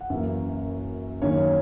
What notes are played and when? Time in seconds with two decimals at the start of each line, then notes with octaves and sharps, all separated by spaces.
0.01 F#5
0.10 F#2 E3 A#3 E5
1.22 F#2 D#3 A#3 C#4 C#5